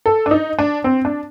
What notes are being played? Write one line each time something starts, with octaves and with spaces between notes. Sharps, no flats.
A4
D4
D#4
D4
C4
D4